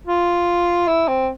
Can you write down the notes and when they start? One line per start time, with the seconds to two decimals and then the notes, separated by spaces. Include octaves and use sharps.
0.07 F4
0.88 E4
1.08 C4